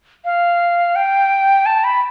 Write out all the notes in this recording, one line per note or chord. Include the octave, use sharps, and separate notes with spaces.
F5
G5
A5
B5